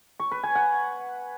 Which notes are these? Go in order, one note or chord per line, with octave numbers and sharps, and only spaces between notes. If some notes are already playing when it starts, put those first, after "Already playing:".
C#6
B4
G#5
F#5